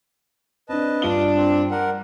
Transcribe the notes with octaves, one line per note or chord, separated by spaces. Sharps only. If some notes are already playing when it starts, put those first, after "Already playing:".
C4 D4 B4 D#5 A5
G2 D4 F4 F5 D#6 G7
C4
G3 A#4 F#5